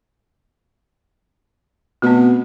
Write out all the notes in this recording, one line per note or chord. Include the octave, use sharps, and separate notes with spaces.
B2 A3 C4